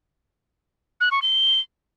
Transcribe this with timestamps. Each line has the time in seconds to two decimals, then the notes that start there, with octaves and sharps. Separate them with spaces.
1.01 F#6
1.11 C#6
1.22 G7